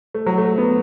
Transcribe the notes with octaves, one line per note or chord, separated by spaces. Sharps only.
A3
F#3
A3
B3